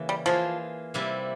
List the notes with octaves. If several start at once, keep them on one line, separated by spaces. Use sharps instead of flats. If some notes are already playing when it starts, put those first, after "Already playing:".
Already playing: C#3 E3 A#3
G3
E3 F3 A#3 F4 G#4 C5
C3 G3 A#3 E4